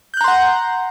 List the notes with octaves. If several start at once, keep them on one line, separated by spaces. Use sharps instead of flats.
F#5 A#5 C6 F#6 G6